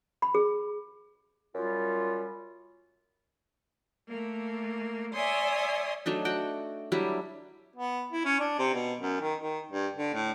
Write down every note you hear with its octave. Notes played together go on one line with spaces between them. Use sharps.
B5
G#4
F#2 G3 F4
A3 A#3
C#5 D5 E5 G#5 C6 D#6
F#3 A3 D4 D#4
F#4 F#5 G5
F#3 G3 D4 E4
B3
E4
C#4
D4
C3
B2
F#2
D#3
D#3
G2
D3
A2